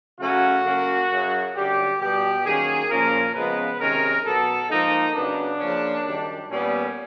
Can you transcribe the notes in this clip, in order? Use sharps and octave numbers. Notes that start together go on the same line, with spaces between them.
C#3 F#3 A3 C#4 F#4
C#3 F#3 A#3 C#4
F#2 C#3 F#3
F#2 D3 G3 G4
B2 G3 B3 G4
D#3 F#3 A#3 C#4 G#4
A#2 F3 A#3 C#4 A#4
C#3 F3 G#3 B3 B4
C3 D#3 G#3 C#4 A#4
B2 F#3 B3 A4
G#2 F3 A#3 D#4
C#3 F#3 B3 D4
C#3 F3 A#3 C#4
F#2 D#3 G3
A#2 G3 B3 C#4